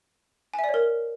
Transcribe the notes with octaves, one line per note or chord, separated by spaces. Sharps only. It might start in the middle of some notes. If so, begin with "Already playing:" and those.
G#5
E5
D5
C#5
A#4